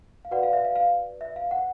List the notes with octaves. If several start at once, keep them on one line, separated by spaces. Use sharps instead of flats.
F5
F#4 B4 D5 F#5
F5
E5
F5
F5
E5
F5
F#5